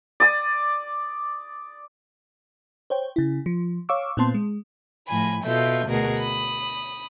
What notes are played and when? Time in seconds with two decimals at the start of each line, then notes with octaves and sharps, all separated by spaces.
0.20 D5 D#6
2.90 C5 C#5 G5
3.16 C#3 E4
3.46 F3
3.89 C#5 F5 C#6 D6 E6
4.17 A#2 B3 C4 A5 C6
4.34 G#3
5.07 A2 F3 G#5 B5
5.44 B2 F4 A4 E5 G6
5.87 D2 B2 G#4 A#4 F#5
6.21 B5 D#6